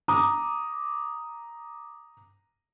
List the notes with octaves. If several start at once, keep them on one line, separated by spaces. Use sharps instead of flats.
A#5 D6 D#6